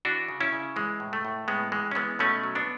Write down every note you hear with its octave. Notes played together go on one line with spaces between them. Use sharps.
E3 D4 F#4
C#3
C#4 E4
C#3
E3 G#3
A2
A3
A2
A2 G#3 B3
E3 G#3
C#4
E3 G#3 B3
B2 A3 C#4
F#3
B3 D4